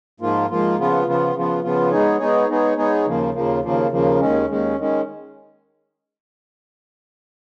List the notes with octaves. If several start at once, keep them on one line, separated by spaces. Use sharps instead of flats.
G#2 F3 A#3 F4
G#2 F3 A#3 F4
C#3 F3 B3 F4
C#3 F3 B3 F4
C#3 F3 B3 F4
C#3 F3 B3 F4
G#3 B3 D#4 G#4 C#5
G#3 B3 D#4 G#4 C#5
G#3 B3 D#4 G#4 C#5
G#3 B3 D#4 G#4 C#5
D#2 C#3 F3 A#3
D#2 C#3 F3 A#3
D#2 C#3 F3 A#3
D#2 C#3 F3 A#3
D#2 D#3 G#3 C#4
D#2 D#3 G#3 C#4
D#3 G#3 C#4